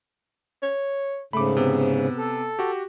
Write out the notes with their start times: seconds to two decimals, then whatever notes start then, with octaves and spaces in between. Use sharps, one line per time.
0.63 C#5
1.33 G#2 C#3 A3 B5 D6
1.57 C3 B3
2.18 A4
2.59 F#4 G4